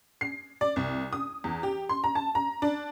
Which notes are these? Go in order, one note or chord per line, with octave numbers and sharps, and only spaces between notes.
C7
D5
C2
D#6
E2
G4
C6
A#5
A5
A#5
D4